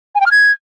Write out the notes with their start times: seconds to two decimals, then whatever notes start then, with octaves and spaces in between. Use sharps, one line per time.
0.15 G#5
0.21 G5
0.26 F6
0.31 G#6